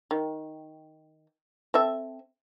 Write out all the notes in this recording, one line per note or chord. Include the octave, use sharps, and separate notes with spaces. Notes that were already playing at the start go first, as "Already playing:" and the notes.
D#3
C4 A4 E5